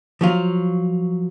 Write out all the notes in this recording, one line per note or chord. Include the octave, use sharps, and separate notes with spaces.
F3 F#3 F4